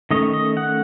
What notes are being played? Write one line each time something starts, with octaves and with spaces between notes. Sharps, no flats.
D#3 A3 C#4 D#5
D#5
F#5